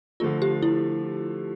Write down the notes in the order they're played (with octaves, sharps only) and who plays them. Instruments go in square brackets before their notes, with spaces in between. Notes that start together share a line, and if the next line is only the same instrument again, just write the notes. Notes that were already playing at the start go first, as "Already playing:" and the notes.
[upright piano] D3 F3 A3 [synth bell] F4
[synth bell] G4
E4